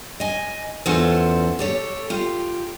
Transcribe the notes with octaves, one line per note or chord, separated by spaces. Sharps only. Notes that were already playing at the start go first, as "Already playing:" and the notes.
D#5 G#5
E2 C#4 F4 A4 C5 F#5
G4 A4 C#5
F4 G4